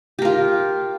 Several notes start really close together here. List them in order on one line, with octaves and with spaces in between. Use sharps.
G4 A#4 F4